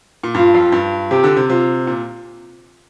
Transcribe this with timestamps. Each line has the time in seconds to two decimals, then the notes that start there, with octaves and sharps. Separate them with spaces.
0.23 A#2
0.35 G2 F4
0.54 F2
0.72 G2
1.11 C3 G4
1.24 D3
1.37 C3
1.49 C3 F4
1.87 A#2